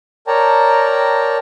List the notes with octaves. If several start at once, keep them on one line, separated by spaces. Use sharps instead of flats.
A#4 C#5 D5 G5 A5 A#5